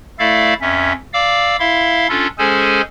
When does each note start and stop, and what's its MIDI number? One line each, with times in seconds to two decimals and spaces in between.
0.19 0.54 57
0.19 0.54 64
0.19 0.54 69
0.19 0.54 74
0.19 0.54 76
0.19 0.54 77
0.61 0.93 41
0.61 0.93 61
0.61 0.93 76
1.13 1.56 74
1.13 1.56 77
1.13 1.56 86
1.13 1.56 88
1.59 2.07 64
1.59 2.07 76
1.59 2.07 77
1.59 2.07 84
2.09 2.27 61
2.09 2.27 62
2.09 2.27 65
2.09 2.27 69
2.38 2.82 56
2.38 2.82 61
2.38 2.82 68
2.38 2.82 69
2.38 2.82 72
2.38 2.82 80